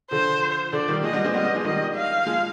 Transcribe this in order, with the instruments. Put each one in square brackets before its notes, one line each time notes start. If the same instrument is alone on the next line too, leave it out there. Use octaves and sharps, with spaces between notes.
[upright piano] D3 F3 [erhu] C5
[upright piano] D3 F3 [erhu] D5
[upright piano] D#3 G3
[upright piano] F3 G#3 [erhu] D#5
[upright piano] G3 B3
G#3 C4
[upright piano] G3 B3 [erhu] D#5
[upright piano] G3 B3
F3 G#3
[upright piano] D#3 G3 [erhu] D#5
[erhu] F5
[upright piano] F3 G#3